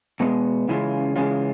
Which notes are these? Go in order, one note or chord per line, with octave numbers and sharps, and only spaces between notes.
B2 G#3 B3
C#3 E3 G#3 C#4 F4
C#3 E3 G#3 C#4 F4